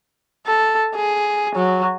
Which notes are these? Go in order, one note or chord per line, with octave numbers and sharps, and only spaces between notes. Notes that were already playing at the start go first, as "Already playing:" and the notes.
A4
G#4
F#3